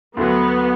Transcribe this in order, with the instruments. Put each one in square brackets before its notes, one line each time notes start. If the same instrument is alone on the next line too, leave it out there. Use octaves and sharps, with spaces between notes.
[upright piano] D2 D3 F#3 [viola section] B3